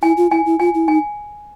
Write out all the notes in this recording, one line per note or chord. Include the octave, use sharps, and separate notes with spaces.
E4 G#5
F4
E4 G#5
E4
F4 G#5
E4
D#4 G#5